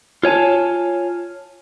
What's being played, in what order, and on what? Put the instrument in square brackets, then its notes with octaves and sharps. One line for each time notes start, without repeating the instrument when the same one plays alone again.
[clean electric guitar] F4 C#5 G#5 A5